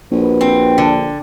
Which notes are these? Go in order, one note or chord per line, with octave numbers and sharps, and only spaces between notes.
A#1 F#4 B4
C4
D3